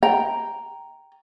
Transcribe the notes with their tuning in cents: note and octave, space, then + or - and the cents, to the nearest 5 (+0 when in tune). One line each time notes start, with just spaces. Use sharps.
G5 -5 A#5 +0